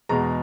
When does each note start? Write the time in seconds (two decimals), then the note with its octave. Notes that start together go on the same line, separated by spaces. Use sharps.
0.09 E2 B2 G#3 A#5